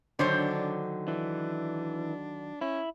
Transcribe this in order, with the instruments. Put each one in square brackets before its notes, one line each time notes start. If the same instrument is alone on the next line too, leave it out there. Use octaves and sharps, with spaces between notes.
[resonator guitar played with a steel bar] D3 C5 C#5 [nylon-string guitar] D#3 F#3 [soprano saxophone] D4
[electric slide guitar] E3 [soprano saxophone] D4
[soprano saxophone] C#4 [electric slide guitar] E4